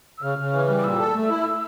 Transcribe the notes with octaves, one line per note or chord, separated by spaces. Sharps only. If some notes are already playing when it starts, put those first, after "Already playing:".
E6
C#3 F6
C#3
E3
G3
D6
A#2 E6
A4
A3
E4